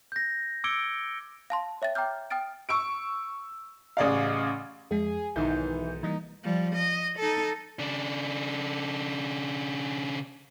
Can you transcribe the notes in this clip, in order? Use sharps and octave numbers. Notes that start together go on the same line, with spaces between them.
G6 A#6
D6 E6 G#6 C#7 D7 G7
F5 A5 C6
C#5 E5 G5 A6
G5 A#5 D6 F6 G6
G5 D#6 F6 A6 D7
C#6 E6 D7
A1 C#3 G#4 D5 D#5 F5
F2 G#3 G#4
B1 G#2 D#3 E3 G6
E3 G3 A#3 D#4
F3 G3
D#5
D#4 A4
C#3 D4